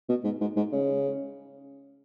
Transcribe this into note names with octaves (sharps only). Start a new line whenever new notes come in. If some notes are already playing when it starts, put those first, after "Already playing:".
B2
G#2
G#2
G#2
C#3